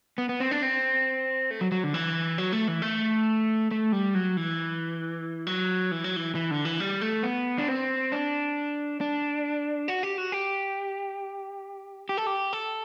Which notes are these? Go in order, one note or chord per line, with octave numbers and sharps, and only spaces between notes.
B3
B3
C4
D4
C4
A3
F#3
F#3
D3
E3
F#3
A3
E3
A3
A3
G3
F#3
E3
F#3
E3
F#3
E3
E3
D3
E3
G3
A3
B3
D4
C4
D4
D4
F#4
G4
F#4
G4
G4
A4
G4
A4